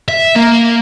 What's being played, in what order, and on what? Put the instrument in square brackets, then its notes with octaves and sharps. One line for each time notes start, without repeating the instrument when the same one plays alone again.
[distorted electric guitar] E5
A#3